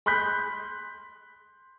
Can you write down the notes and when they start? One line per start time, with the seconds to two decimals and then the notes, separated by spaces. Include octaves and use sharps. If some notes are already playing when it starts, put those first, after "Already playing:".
0.06 B5 C6 F#6 G6 B6